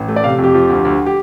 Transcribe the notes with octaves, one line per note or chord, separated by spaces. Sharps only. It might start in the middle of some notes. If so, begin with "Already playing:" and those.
Already playing: A1
A3
D5
C3 F5
F2
G4
F3
D2
D2
G4